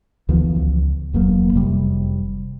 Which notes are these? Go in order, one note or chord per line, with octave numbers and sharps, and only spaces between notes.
D2 E3 F3 B3
C#2
D#1 E2 F#3 A#3
F1 C3 G3